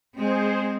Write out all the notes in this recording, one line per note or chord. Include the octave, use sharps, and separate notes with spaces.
G#3 C4 G#4 C5